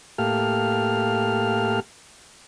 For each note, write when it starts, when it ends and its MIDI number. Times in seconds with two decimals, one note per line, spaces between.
0.18 1.80 45
0.18 1.80 58
0.18 1.80 67
0.18 1.80 69
0.18 1.80 77
0.18 1.80 89